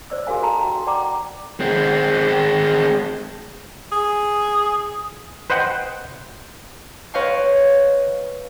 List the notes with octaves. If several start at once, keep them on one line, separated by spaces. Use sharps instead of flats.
C5 D5 E6
F#4 G#4 A#4 F5 G#5
A4 F5 A5 A#5
F#4 G5
D5 F#5 G5 A#5 D6
G#3 C4
G#4
B4 C5 D#5 F#5 G5
B4 C#5 D#5 F5 G5 C6